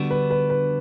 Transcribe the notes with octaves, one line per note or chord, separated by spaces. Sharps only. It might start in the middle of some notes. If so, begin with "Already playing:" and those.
Already playing: D3 G3 B3 D4 F#4
B4
B4
B4